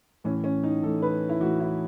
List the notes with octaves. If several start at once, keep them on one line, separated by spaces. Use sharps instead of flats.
A2 E3 C#4
C#4
D#4
A2 E3 A4
B4
E4
A2 E3 F#4
E4